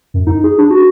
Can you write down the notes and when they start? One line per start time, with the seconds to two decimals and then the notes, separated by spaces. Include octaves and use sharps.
0.14 F#2
0.27 D#4
0.44 G#4
0.58 D4
0.71 F#4